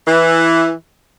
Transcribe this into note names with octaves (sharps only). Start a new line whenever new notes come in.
E3